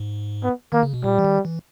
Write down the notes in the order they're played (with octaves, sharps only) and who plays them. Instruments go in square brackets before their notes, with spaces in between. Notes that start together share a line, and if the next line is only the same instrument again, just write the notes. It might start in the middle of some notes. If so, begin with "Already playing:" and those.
Already playing: [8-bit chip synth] G#2
[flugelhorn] B3
[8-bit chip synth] D#3 [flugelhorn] A#3
[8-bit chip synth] C#3
B2
[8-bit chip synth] A#2 [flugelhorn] G3
[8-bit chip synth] E3
D#3
E3